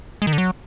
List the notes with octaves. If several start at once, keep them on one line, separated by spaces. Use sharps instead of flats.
G#3
D#3
D3
F#3